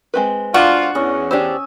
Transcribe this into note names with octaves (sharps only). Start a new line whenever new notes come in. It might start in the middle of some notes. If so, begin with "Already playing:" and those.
G#3 C4 B4
D4 F4 F#4
E2 C#4 D#5
D4 G4 C5 G#5 E6